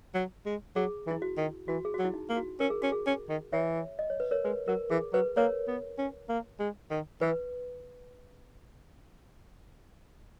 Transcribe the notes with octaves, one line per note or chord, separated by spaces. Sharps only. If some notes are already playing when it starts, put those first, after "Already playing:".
F#3
G#3
F#3 G#4
E3
E4
F#4
D#3
E3 F#4
G#4
F#4
F#3
E4
D#4
A#3
F#4
C#4 A#4
G#4
C#4 F#4
G#4
C#4 G#4
D#3
E3 C#5 E5
D#5
C#5
B4
A#4 C#5
G#3 B4
F#3 A#4
E3 G#4
F#3 B4
A#3 A#4 C#5
B3
C#4
A#3
G#3
D#3
E3 B4